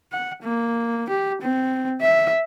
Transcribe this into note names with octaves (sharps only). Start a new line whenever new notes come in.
F#5
A#3
G4
C4
E5